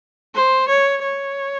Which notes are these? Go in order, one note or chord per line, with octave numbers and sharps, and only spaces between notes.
C5
C#5
C#5